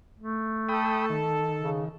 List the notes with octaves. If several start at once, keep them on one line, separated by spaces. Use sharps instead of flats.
A3
A4 G5 B5 D#6
D#3
C#3